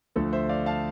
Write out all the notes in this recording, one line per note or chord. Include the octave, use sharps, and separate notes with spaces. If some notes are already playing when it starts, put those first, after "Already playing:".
D2 D3 F3 A3 A4
C5 E5
D5 F5
F5 A5